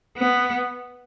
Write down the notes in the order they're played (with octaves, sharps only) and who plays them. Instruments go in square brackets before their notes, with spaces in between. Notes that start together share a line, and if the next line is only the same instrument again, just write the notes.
[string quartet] B3